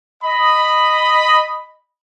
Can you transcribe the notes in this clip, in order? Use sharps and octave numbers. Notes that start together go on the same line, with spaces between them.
D#5 B5